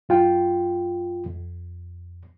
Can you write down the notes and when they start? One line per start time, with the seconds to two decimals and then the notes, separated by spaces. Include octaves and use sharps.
0.09 F#2 F4 G5
1.26 F2